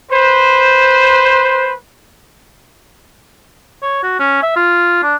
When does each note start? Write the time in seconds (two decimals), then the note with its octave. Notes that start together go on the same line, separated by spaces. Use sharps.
0.12 B4 C5
3.83 C#5
4.03 F#4
4.20 C#4
4.43 E5
4.56 F4
5.03 D4